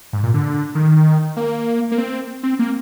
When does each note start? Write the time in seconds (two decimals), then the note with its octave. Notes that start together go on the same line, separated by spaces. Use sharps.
0.13 G#2
0.23 A#2
0.34 D3
0.75 D#3
1.37 A#3
1.91 A#3
1.98 C4
2.43 C4
2.59 A#3